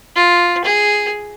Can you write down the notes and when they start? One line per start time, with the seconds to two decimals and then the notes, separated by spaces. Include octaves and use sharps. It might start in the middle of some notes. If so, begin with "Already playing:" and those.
0.16 F4
0.65 G#4